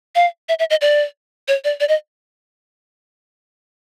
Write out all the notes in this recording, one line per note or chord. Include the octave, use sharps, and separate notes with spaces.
F5
E5
E5
D#5
D5
C#5
D5
D5
D#5